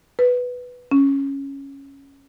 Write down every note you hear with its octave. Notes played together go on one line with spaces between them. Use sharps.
B4
C#4